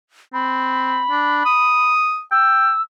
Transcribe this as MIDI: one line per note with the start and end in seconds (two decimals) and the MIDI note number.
0.33 1.03 60
0.33 1.93 83
1.10 1.42 62
1.45 2.21 87
2.32 2.71 79
2.32 2.82 88